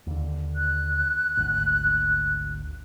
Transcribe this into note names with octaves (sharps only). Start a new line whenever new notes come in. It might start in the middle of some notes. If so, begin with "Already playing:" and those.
D#2 D3
F#6
G#1 D2